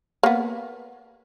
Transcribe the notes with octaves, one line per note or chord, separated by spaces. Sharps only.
A#3 B3